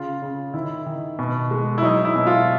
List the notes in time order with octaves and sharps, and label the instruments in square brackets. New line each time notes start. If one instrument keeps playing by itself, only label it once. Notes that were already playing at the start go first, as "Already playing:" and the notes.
Already playing: [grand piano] C#3 F4
C#3
D#3 E4
D#3
B2
G#3
E4
F#3 D#4
E4
B2
F4